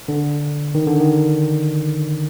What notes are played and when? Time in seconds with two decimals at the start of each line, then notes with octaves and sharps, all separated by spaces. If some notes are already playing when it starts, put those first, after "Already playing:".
0.08 D3
0.75 D#3
0.87 D3
1.00 D#3